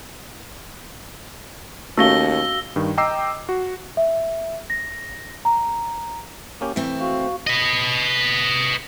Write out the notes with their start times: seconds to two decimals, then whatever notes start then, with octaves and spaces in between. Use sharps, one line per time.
1.97 D#2 A3 C#4 F#4 F5 E6 A#6 G7
2.76 G2 D#3
2.97 D#5 G5 A#5 D6 E6 C7
3.49 F#4
3.97 E5
4.70 A#6
5.45 A#5
6.61 A#3 C#4 G4
6.76 E3 A3 C4
6.99 F#4 F5 C#6
7.47 B4 D#5